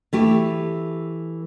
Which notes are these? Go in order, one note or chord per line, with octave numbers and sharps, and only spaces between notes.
E3 A3 G4